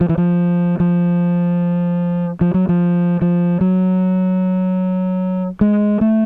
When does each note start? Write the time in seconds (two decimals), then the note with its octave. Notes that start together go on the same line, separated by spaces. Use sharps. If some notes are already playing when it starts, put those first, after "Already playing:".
0.01 F3
0.09 E3
0.18 F3
0.80 F3
2.41 F3
2.54 F#3
2.69 F3
3.22 F3
3.61 F#3
5.61 G#3
6.01 A3